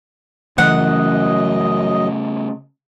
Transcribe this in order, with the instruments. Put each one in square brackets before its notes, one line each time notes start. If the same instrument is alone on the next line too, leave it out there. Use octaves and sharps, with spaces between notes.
[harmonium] F#2 D#5 [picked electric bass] C#3 A3 [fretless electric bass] E3 [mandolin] F#5